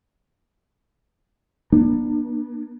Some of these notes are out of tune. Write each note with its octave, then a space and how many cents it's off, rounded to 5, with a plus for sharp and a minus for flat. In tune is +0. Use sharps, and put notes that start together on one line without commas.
A#3 +45 D4 +30